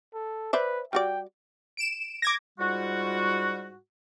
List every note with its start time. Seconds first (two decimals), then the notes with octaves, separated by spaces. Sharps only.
0.14 A4
0.53 B4 C5 D5 E5
0.93 G3 F#4 D5 G5
1.77 D7 E7
2.22 D6 G#6 A#6
2.59 G#2 G3 F4 F#4